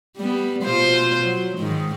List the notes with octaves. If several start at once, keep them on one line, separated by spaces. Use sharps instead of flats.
G3 B3
B2 F4 C5
F#3
G#2 D#3